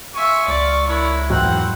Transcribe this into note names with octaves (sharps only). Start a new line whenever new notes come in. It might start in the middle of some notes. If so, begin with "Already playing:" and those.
F4 E5 G#5 C#6
C#2 D5
D4 E4 A#4 C#5
E2 G#2 F#3 A#3 C4 F#5